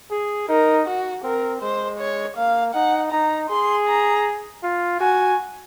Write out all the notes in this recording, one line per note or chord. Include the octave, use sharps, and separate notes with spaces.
G#4
D#4 A#4
F#4
C4 A#4
G#3 C5
C#5
A#3 F5
D#4 F#5
D#4 A#5
G#4 C6
A#5
F4
F#4 G#5